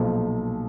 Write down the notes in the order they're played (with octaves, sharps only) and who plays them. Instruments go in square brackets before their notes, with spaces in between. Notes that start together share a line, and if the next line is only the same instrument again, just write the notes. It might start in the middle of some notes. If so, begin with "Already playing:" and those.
Already playing: [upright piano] B1 A#2 F3